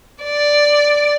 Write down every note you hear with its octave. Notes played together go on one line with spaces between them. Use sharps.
D5